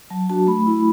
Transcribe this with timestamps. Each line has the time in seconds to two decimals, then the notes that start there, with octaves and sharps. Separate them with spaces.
0.10 F#3 A5
0.30 D4 F#4 A5
0.47 A3 B5
0.66 E4